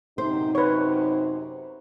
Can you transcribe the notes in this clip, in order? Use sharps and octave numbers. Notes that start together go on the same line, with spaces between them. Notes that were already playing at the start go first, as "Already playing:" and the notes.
F#2 C3 D#4 C5
B4 C#5